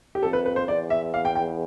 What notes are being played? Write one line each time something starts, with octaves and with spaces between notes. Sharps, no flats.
G4
F2 A4
B4
B4
C5
E2 D5
E5
F5
G5
G5